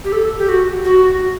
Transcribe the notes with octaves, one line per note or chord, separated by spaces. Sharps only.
G4
A4
G4
F#4
F#4